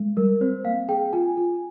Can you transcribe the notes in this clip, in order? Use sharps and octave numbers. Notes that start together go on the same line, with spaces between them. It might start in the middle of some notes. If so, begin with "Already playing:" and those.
Already playing: G#3
G3 A#4
C4 C5
A#3 F5
G#4 G5
F4 G#5
F4